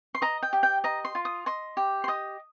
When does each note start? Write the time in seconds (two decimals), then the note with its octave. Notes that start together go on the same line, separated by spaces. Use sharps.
0.15 C6
0.22 D#5 A#5
0.43 G5
0.53 G4
0.63 G5
0.84 D#5 A#5
1.05 C6
1.15 F4
1.25 D#6
1.46 D#5 C6
1.77 G4
2.04 C6
2.08 D#5 D#6